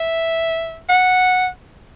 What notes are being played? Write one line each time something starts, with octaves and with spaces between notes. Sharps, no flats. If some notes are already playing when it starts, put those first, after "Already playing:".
Already playing: E5
F#5